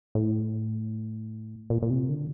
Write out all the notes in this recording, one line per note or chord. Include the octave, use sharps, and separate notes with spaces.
A2
A#2
A#2
C3
D3